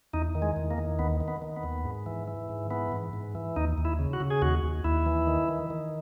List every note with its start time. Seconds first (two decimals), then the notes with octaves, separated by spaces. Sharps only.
0.13 E2 D#4
0.35 D#3
0.42 G#3
0.56 E2
0.71 A#3
0.78 D#3
0.99 D#2 B3
1.21 D#3
1.28 B3
1.42 D#3
1.56 B3
1.63 D#2
1.85 G#2
2.06 E3
2.28 E3
2.49 G#2
2.70 E3 B3
2.92 G#2
3.13 G#2
3.35 E3
3.56 D#2 D#4
3.78 D#2
3.85 E4
3.99 C#3
4.13 F#4
4.20 C#3
4.30 G#4
4.42 D#2 F#4
4.63 D#2
4.84 D#2 E4
5.06 E3
5.27 D#3
5.49 D#3
5.70 D#3